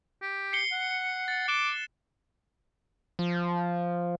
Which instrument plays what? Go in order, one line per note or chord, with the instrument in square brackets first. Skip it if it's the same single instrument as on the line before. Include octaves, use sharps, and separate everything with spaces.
[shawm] G4
[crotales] C7 C#7 G7
[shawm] F#5
[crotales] A6
[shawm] D6 [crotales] F#6 E7 G7
[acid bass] F3